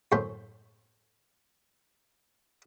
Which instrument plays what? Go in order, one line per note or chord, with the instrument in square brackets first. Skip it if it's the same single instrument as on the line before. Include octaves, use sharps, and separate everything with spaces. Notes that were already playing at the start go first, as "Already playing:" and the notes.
[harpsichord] F#2 A2 A3 C5